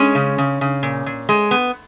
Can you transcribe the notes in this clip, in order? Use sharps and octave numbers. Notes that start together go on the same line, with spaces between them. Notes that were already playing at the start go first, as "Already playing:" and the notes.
Already playing: G#3 C#4
C#3
C#3
C#3
A#2
A#2
G#3
B3